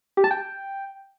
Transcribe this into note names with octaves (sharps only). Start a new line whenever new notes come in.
G4
A5
G5